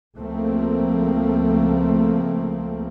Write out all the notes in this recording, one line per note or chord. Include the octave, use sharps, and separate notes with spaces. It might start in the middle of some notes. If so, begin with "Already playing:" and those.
C#2 F3 A3 A#3 C4